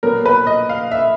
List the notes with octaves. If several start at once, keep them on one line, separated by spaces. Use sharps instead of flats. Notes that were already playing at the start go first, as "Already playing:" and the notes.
A#2 F#3 B3 A#4
B4
D#5
F5
E5